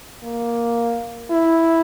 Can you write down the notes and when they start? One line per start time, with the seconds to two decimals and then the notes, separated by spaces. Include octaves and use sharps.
0.23 A#3
1.31 E4